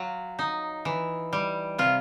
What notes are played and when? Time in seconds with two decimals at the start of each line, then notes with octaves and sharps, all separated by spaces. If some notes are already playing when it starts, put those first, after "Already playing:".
Already playing: F#3 F4
0.39 D#4
0.85 E3
1.33 G3
1.78 C3 F4